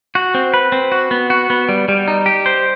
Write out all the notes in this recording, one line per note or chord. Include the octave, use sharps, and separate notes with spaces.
F#4
C4
B4
C4
F#4
B3
F#4
B3
G3
G3
D#4
G4
C5